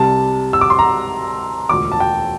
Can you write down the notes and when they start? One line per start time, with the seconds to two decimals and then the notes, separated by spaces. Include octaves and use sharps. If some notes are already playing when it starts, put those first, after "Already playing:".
Already playing: C2 C3 G3 A5
0.53 E6
0.61 D6
0.70 C6
0.79 A#5
1.69 E1 D2 D3 F3 D6
1.92 A5
2.00 G5